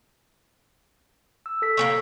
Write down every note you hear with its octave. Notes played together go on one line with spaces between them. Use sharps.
E6
A4 E6 B6
A#3 C4 A4 C#5